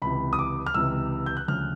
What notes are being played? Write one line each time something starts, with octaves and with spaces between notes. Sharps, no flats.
C#2 C3 E3 B5
D#6
D6
F6
C#2 C3 E3 E6
G6
F#6
D2 C#3 F3 F6